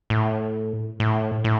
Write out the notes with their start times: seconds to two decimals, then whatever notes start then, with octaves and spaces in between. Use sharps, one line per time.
0.10 A2
1.00 A2
1.44 A2